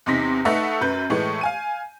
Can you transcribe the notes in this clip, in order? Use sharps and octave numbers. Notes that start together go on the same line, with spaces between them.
E2 C3 D#4 C6 A#6 B6
A3 D#4 A4 B4 E5 F#5
F#2 B4 G6
A2 E3 G#3 A3
F5 G#5 D#7